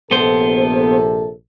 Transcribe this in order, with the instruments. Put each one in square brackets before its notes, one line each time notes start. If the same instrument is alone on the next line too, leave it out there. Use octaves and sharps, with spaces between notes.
[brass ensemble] A#1 C3 A4 [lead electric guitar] B3 C5